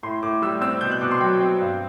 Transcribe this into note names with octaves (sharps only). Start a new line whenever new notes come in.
A2 C6
A2 D6
G3 E6
C4 E6
B2 G6
F#6
B2 D6
C6
F#3 G5
C4
G2